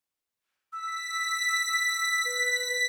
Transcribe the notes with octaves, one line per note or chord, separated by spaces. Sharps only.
E6 B6
B4